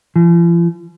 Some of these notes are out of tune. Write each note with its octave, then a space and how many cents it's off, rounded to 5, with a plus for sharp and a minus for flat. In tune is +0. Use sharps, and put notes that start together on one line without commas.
F3 -45